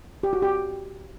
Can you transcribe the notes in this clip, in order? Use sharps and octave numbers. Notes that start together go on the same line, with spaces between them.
G4
F#4
G4